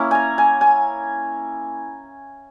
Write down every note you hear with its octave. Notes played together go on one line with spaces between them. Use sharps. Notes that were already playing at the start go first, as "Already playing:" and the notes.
Already playing: A#3 C#4 E4
G#5 A#5
G#5
G#5